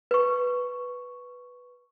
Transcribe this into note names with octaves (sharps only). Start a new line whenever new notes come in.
B4 C#6